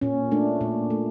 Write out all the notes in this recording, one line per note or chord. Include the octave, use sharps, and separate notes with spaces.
A#2 C#4
A3 D4
A#2
A3